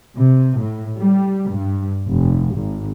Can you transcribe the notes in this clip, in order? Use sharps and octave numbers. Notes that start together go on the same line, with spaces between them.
C3
A2
G3
G2
F1
G#1